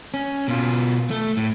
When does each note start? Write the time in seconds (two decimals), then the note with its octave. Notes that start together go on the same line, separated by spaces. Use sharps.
0.14 C#4
0.48 B2 F4
1.10 A3
1.37 A2